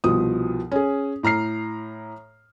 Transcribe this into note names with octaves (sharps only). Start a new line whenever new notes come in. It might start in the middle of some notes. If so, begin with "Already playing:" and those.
C2 B2 F3 D#6
C#4 G#4
A2 A#5 F6 C7